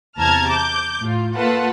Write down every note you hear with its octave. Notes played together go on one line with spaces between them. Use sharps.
E2 C3 A5 A#5 F6 G#6
D6 G6
A2 F4
A3 A#3 F4 B4 F#5 A5